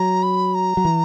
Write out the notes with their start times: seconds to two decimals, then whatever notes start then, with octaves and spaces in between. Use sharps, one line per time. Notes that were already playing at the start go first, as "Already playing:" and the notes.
Already playing: F#3 A#5
0.23 B5
0.55 A#5
0.77 F#3
0.85 E3